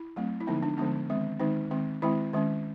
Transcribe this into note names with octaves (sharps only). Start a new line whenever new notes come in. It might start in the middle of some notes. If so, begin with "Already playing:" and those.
Already playing: E4
F#3 A3 C4
E4
D3 F3 G#3 B3 D#4
D4
D3 F3 G#3 B3 D4
D#3 G#3 C4
D#3 G#3 C4 D#4
D#3 G#3 C4
D#3 G#3 C4 E4
D#3 G#3 C#4